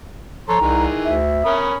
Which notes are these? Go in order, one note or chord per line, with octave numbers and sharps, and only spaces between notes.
F3 A4 C#5 A#5 C6
C2 D#3 E3 G#4
D2 E5
C#4 A#4 B5 D#6